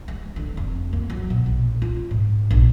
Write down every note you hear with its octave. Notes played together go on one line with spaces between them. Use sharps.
G#3
D3
F1
A#3
F#3
B2
A#1
F4
G#2
A#1